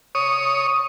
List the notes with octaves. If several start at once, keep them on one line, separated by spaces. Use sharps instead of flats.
C#5 D#6